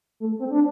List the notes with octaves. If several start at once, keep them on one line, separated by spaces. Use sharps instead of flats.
A3
C4
D4